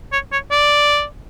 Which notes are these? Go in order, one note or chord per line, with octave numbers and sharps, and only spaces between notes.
C#5
C#5
D5